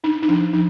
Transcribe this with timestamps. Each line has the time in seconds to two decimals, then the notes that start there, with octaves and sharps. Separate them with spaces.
0.04 D4 D#4
0.22 D#4
0.28 F3 D4
0.53 F3 D#4